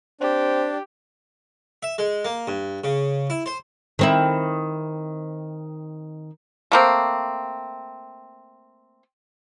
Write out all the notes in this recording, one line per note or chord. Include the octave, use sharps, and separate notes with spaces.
C4 D4 G4
E5
G#3
A#3
G2
C#3
E4
C5
D#3 C4 E4
A3 A#3 C4